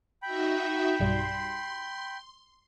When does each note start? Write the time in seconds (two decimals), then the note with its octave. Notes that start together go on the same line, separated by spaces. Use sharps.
0.22 D#4 F#4 E5 G5 B5
1.00 B1 G2 G3 C6